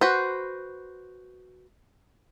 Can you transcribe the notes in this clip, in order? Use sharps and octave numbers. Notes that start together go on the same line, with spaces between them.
F#4 B4 C5